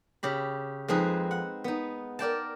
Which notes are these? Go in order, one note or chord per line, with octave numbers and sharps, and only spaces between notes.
C#3 G4 B5
F2 G#3 C4 D#4 G#4 B4
F#5
B3 D#4
A#4 D5 G5 A5